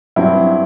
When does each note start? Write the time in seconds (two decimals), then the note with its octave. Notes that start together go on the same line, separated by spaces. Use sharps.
0.16 G2 F#3 C4 E4